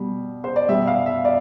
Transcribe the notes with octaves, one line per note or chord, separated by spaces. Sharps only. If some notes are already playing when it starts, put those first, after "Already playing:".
Already playing: B2 G3
C5
D5
B2 G3 E5
F5
E5
D5